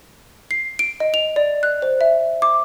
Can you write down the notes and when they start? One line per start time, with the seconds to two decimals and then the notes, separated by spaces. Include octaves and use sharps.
0.51 C7
0.79 D7
1.00 D#5
1.14 F7
1.36 D5
1.63 F#6
1.82 C5
2.01 E5
2.42 D6